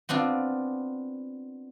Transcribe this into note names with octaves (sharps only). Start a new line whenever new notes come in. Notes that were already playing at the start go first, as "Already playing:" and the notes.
B3 C4 D4 F4